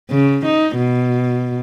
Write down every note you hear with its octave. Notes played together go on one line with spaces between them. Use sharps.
C#3
D#4
B2